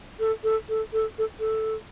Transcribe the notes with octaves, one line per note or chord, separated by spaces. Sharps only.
A4
A4
A4
A4
A4
A4